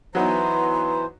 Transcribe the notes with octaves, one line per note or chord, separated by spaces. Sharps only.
E3 F#3 B3 D#4 C5 A#5